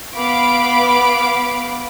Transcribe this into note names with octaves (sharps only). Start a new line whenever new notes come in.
B3 F5 B5 D6 D7